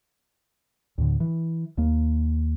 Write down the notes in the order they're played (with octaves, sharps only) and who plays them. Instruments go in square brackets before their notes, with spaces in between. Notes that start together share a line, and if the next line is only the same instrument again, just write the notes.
[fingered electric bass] D2 A2 D3
E3
D#2 A#3